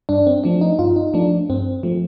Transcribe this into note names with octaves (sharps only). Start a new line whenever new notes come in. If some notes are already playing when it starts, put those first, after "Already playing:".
G2 D4
C4
F3 A3 D4
D#4
G2 F4
D#4
F3 A3 D4
G2 C4
F3 A3